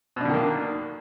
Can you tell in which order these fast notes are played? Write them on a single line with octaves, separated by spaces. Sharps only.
B2 D4 D3 D#3 A#3